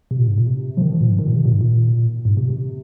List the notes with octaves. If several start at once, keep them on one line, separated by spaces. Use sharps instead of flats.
C3
A#2
G#2
A#2
C3
F3
D#3
F3
A#2
G#2
D#3
A#2
C3
A#2
G#2
A#2
G#2
C3
C3